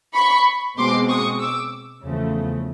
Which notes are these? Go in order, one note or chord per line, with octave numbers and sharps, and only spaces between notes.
B5 C#6
B2 G#3 C4 C6 D6
C#6 D#6
D6 E6
E2 C#3 F3 A3